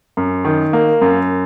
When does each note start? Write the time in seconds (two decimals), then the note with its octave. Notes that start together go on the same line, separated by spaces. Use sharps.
0.17 F#2
0.45 D#3
0.73 A#3
1.01 F#2